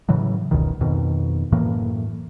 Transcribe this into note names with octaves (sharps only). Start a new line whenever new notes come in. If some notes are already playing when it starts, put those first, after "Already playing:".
A2 C#3 E3 F#3
F1 C#2 B2 D#3
F2 B2 D#3
F#2 A2 E3 A#3